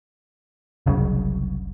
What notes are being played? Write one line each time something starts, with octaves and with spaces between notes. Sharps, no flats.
F#1 C2 F#2 C#3